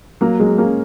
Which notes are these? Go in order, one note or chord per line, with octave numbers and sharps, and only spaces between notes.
F#3 A#3
F#3 G#3
A#3 C#4